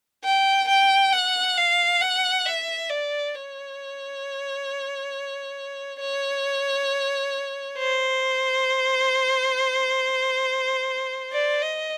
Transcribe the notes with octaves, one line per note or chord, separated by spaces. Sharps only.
G5
G5
F#5
F5
F#5
E5
D5
C#5
C#5
C5
D5
D#5